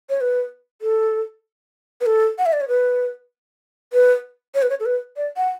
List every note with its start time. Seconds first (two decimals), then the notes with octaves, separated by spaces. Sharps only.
0.10 C#5
0.21 B4
0.82 A4
2.01 B4
2.06 A4
2.38 F#5
2.46 E5
2.53 D5
2.61 C#5
2.68 B4
3.93 B4
4.55 C#5
4.62 B4
4.70 C#5
4.80 A4
4.86 B4
5.17 D5
5.37 F#5